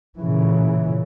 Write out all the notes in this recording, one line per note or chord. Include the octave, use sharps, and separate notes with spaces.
A#2 C#3 E3